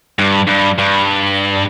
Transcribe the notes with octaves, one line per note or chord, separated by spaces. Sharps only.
G2
G2
G2